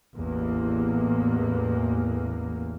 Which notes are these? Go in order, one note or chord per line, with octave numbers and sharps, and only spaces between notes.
A1 E2 A#3